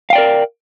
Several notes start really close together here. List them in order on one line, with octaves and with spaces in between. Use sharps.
F5 G5 D5 A#4